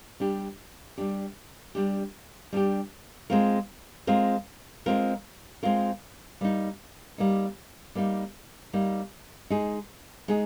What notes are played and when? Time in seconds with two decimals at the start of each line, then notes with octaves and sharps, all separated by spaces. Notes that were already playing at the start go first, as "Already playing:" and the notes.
0.20 G3 D4 G4
0.97 G3 D4 G4
1.75 G3 D4 G4
2.52 G3 D4 G4
3.30 G#3 C4 F4 A#4
4.07 G#3 C4 F4 A#4
4.86 G#3 C4 F4 A#4
5.63 G#3 C4 F4 A#4
6.41 G3 A#3 D#4
7.18 G3 A#3 D#4
7.95 G3 A#3 D#4
8.73 G3 A#3 D#4
9.50 G#3 D#4 G#4
10.28 G#3 D#4 G#4